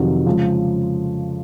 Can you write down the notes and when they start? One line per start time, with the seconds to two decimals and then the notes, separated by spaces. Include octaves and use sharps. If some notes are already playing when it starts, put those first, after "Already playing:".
Already playing: F2 C3 D#3 F#3
0.26 C#3 F3 G#3